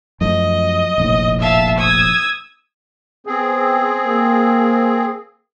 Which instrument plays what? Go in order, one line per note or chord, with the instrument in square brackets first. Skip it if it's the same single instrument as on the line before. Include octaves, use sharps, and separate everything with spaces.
[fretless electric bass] F#2 F3 A3 [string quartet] D#5
[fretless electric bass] F1 A#1 A2
[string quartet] E5 F5 A5
D#6 E6 G#6
[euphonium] B3 [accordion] C4 G#4
[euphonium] A#3